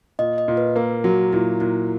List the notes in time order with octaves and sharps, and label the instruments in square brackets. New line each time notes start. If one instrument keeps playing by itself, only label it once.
[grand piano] A#2 [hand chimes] D#5
[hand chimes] D#5
[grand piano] A#2
[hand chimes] B4
[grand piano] A#3 [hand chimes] A#4
[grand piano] F#3 [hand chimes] F#4
[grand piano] A#2 [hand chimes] E4
[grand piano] A#2 [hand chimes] E4